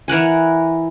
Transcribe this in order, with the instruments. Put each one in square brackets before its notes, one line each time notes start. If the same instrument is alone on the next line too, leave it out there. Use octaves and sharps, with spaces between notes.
[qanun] E3 A#4 F#5 G#5